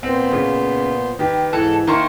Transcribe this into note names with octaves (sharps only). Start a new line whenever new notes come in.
A#2 B3 C4 C5
C#3
D#3 G4 B4
G#2 E3 A4
D#3 A#3 E4 A#4 C5 C#6